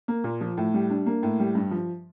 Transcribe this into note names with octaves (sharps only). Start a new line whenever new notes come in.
A#3
A#2
F3
A2
G3
D4
A#3
A2
G3
G2
F3